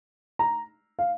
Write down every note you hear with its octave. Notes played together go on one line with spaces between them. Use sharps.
A#5
F5